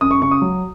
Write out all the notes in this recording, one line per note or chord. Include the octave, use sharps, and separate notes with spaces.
F#2 D#6
C#6
C#3 C#6
D#6
F#3